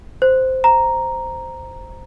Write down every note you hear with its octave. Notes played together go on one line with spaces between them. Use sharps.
C5
A#5